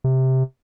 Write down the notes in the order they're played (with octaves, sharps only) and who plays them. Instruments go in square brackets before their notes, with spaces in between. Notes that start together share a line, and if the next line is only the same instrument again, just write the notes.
[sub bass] C3